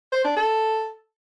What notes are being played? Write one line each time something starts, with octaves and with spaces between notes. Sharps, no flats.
C5
D4
A4